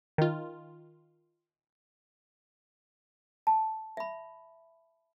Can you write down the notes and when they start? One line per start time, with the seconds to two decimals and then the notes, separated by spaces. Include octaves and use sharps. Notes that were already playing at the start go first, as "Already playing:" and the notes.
0.18 D#3 F4
3.47 A5
3.97 E5 B5